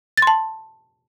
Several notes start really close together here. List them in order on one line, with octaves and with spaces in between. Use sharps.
A6 C6 A5